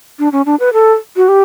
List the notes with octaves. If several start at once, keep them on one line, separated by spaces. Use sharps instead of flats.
D4
C#4
D4
B4
A4
F#4
G4